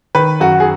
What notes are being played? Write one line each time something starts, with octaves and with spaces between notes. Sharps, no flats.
D#3 B4
F#2 F#4
G#4